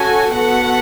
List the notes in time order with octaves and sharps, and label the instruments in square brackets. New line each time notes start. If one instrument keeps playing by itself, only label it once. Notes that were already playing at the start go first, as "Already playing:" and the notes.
Already playing: [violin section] C#4 F#4 A4 G#5
B3 F#4 A4 F#5